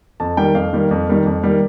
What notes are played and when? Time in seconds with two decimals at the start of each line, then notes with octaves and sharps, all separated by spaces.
0.20 F2 A5
0.37 D#3 G3 A#3 G5
0.55 F2 F5
0.73 D#3 G3 A#3
0.91 F2
1.07 D#3 G3 A#3
1.26 F2
1.43 D#3 G3 A#3